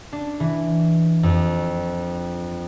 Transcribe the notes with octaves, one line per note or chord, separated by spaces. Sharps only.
D4
E3
F2